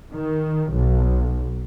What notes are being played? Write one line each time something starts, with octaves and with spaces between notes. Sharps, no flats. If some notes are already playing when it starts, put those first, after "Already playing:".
D#3
B1